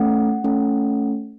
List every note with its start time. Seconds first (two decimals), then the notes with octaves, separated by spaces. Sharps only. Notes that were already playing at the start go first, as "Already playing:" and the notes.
Already playing: A3 C#4 A4 F#5
0.44 A3 C#4 A4